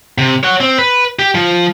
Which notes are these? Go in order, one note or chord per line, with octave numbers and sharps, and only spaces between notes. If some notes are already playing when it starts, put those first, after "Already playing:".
C3
C#5 F#5
C4
B4
G4
F3